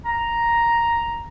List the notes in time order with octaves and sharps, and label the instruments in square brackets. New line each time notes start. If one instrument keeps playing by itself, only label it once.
[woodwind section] A#5